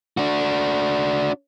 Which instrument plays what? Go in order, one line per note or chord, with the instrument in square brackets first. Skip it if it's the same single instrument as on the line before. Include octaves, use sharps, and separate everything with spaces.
[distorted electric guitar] D4 F#4